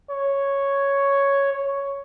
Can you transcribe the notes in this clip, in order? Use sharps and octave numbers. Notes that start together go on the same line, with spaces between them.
C#5
C#5